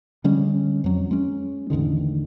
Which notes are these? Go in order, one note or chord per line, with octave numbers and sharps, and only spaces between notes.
D3 G3 G#3 C#4
F2 F#3
G#3 C#4
A1 E2 D3 D#3